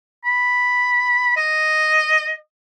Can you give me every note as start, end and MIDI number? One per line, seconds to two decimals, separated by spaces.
0.25 1.36 83
1.37 2.34 75